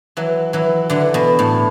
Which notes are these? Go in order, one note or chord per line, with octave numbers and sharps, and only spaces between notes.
E3 F#3
E3 F#3
D3 E3
B2
A2